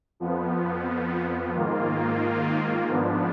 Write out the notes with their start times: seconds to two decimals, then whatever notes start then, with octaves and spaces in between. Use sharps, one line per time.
0.20 F2 F3 B3
1.54 G#2 D#3 A#3 F4
2.88 G#2 F3 B3 D4